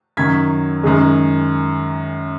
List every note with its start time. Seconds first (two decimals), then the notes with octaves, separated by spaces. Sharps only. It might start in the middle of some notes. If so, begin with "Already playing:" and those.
0.17 F#2 D#3 F#3 G#6 B6
0.83 F#2 D#3 G#3